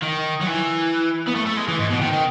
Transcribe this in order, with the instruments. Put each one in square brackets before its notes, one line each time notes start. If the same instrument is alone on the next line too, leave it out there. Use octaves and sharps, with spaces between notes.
[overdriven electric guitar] D#3
F#3
E3
B3
A3
A3
G#3
E3
G#2
B2
D#3
D#3